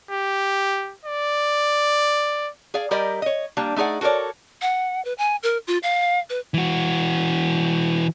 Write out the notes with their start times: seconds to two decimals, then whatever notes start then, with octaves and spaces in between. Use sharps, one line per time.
0.11 G4
1.05 D5
2.74 G#4 D5 F5
2.91 G3 G4 A#4 D5 D#5
3.22 C#5 D#5
3.57 G3 A#3 D4
3.76 A3 D#4 G#4 D5 F#5
4.01 F#4 A4 A#4 C#5 D5
4.61 F#5
5.05 B4
5.18 G#5
5.43 A#4
5.67 F4
5.83 F5
6.30 B4
6.54 E3 F#4